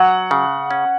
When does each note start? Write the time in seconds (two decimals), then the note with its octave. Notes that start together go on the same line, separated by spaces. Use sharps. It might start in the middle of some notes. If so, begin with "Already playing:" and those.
Already playing: F#3 F#5
0.31 C#3
0.71 C#4